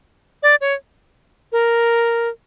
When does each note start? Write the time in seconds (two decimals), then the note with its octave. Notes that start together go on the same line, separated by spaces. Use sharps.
0.43 D5
0.61 C#5
1.52 A#4